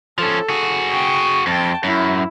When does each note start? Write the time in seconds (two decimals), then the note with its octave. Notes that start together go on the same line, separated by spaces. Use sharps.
0.18 F3 C#4 A4
0.49 F#4 G#4
0.90 G5 C#6
1.47 F2 G5 A5
1.84 F#2 E4